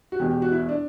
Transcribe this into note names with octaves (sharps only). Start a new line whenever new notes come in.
F#4
E1 E2 B2 G4
G4
F#4
E4
D4